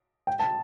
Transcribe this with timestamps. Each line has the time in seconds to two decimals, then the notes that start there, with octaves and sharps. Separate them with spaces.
0.27 G5
0.39 A5